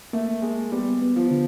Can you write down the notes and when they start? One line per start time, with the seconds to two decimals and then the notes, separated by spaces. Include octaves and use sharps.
0.13 A3 A#3
0.42 G#3 A#3
0.72 G3 B3
1.02 B3
1.16 F3
1.31 D3